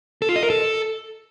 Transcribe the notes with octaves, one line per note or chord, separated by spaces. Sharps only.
A4
F4
D#5
A#4
A4